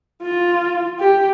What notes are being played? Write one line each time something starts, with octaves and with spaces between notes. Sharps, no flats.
F4
G4